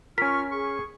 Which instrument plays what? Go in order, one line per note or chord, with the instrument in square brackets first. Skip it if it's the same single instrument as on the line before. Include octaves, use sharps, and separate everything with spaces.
[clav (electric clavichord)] C#4 A#4 [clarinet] F4 [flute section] C#6 F6 [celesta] B6
[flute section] G#4 [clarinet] C#6